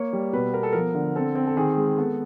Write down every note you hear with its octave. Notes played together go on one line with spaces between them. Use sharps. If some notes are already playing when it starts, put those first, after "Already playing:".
Already playing: A#3 C#5
G3
B2 B4
B3 A#4
A4
F3 A#4
D3
C4 A4
C4
A4
D#3 G#4
G#3
B3 A4